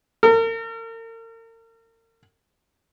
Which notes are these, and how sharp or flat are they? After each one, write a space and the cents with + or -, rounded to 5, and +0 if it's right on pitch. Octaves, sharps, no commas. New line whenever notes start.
A#4 -40